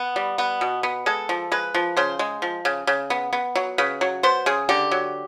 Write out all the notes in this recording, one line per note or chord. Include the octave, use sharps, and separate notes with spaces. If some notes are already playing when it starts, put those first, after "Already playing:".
Already playing: B3
G3
B3
B2
B3
G#3 A4
F3
G#3 B4
F3
C#3 C5
G#3
F3
C#3
C#3
B3
B3
F#3
C#3 B4
F#3
B3 C5
C#3 G#4
D3 G4
F#3